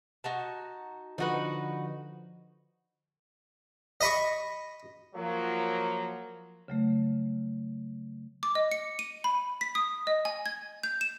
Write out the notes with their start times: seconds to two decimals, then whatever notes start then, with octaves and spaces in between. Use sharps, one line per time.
0.24 D#4 F#4 A5
1.18 D3 F3 D#4 F#4 B4
4.01 D#5 B5 C#6
5.16 F3 F#3 A#3
6.68 C#3 F#3 A3
8.43 D6
8.55 D#5
8.72 C#7
8.99 D#7
9.24 B5
9.61 B6
9.75 D#6
10.07 D#5
10.25 G#5
10.46 G#6
10.83 G6
11.01 E7